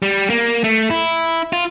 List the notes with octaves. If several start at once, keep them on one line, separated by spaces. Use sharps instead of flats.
G3
A#3
A3
E4
F4